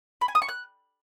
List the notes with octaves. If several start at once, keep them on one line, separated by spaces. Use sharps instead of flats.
B5
G#5
D#6
C#6
F#6